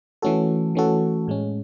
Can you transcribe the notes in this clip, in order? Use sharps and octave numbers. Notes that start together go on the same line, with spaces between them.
E3 A3 C#4 F#4 A4
E3 A3 C#4 F#4 A4
A2 G#3 C#4